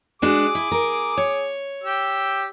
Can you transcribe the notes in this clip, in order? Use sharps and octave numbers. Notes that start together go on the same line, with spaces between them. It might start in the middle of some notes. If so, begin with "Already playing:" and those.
G#3 D4 F#4 G#4 D6
E4
A#4
C#5
G4 G5 E6